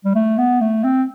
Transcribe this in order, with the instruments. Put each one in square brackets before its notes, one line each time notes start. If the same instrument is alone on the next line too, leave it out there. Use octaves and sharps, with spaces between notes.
[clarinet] G3
A3
B3
A3
C4